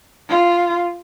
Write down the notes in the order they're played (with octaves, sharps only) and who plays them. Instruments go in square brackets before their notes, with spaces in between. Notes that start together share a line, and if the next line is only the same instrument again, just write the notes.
[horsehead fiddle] F4